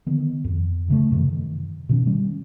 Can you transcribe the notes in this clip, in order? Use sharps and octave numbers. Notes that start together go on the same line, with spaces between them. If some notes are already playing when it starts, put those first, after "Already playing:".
D3 D#3 B3
F2
D2 C#3 A3
F#2 C3 D#3 E3
B2 D#3 C#4
G3 C#4